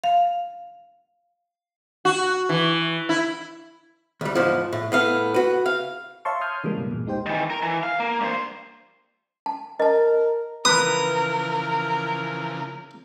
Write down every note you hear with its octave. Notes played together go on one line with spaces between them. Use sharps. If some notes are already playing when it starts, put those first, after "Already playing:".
F5
F#4
E3
E4
D2 G3
E2 G#2 F3
A2
A2 B3 F5
F#4 B4
F5
C#5 E5 F5 A5 C6 C#6
A5 C6 D#6 F6 G6 G#6
C#3 E3 G3 G#3 A#3
G2 B2
E2 A#2
B1 G#3 D#4 G4 C5 G5
D#3 E3
A#4
E3
F5
A#3
G2 C5
A5
A#4 D#5 A5
C#3 E3 F3 A#4 B4 D#6